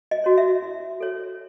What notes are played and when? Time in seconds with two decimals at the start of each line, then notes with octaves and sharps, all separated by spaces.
0.11 D#5
0.24 F#4 C#5
0.38 E5
0.62 E4
1.00 A4 C#5